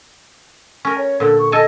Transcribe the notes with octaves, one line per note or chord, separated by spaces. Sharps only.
C#4 A#4 G#5
C#5
A#2 D3 A4
C#6
A4 D#5 G#5 A5